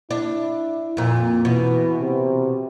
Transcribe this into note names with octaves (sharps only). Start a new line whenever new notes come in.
D4 E4
F2 A#2
B2 E3
C3